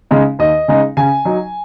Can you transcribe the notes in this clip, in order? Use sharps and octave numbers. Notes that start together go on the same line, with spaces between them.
C#3 G#3 D#4
D#2 D#5
C#3 G#3 D#4
C#3 G#5
F#3 D#4